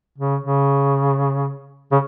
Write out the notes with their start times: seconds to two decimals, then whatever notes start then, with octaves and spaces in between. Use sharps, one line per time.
0.18 C#3
0.44 C#3
1.92 C#3